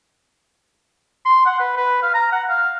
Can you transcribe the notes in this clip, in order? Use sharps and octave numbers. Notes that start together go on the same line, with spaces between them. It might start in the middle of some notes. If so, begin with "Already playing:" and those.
C6
F#5
B4
B4
F5
A#5
F#5
F5